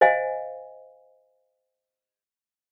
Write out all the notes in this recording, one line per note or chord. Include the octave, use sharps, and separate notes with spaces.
C5 D#5 F5 G#5